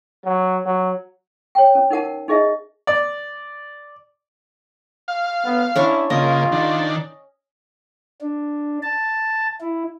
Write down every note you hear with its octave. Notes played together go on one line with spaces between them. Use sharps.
F#3
F#3
C#5 G5
C#4
D#4 A#4 F#5 A5
D#4 G#4 D#5 E5
D5
F5
B3
C#4 D4 E4 C#6
C#3 A#3 F4 D#5
D#3 D4
D4
A5
E4